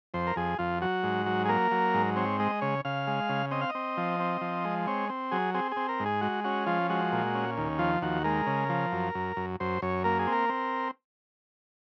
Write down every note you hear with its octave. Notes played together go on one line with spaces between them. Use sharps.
F2 C5
A#4
F2 G#4
F2 F4
F#3 F#4
G#2
F#3
G#4
A#3 A#4
F#3
G#2
C4 C#5
G#3 D#5
C#3 C#5
C#3 F5
G#3
C#3
C4 D#5
F5
D#5
C4
F3
C4
F3
G#3
C4 C#5
C4
F#3 G#4
C4 G#4
C4 G#4
A#4
G#2
G#4
G#3 F#4
C#4 F#4
F3 F4
G#3 F#4
A#2
C#4
D#2
F3 F4
D#2 F#4
G#3 A#4
C#3
F3
F#2
F#2
F#2
F#2 C5
F#2 C#5
A#3 A#4
G#4
C4
A#4
C4